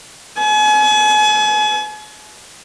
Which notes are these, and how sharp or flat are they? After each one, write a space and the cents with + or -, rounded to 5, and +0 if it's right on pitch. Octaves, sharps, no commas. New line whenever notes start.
G#5 +40